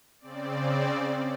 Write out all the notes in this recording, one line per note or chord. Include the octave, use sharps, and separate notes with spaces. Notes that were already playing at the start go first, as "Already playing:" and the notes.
C#3 C4 D5